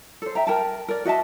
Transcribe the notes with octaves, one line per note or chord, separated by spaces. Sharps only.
A4 C5
E5 G5 A#5
A#4 G5 A5
A#4 D5
F#4 D#5 E5 A5